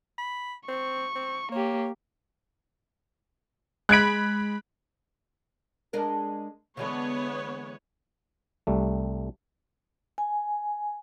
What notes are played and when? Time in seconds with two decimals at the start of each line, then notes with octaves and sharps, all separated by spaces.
0.18 B5
0.68 C4 C#6
1.15 C4
1.52 A#3 G4 C#5
3.89 G#3 B5 F#6 G#6 D7
5.93 G#3 D4 A#4
6.77 D3 E3 G#3 B3 C#5
8.67 C2 G3 A3
10.18 G#5